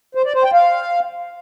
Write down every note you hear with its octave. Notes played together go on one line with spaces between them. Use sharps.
C5
D5
C5
G5
F5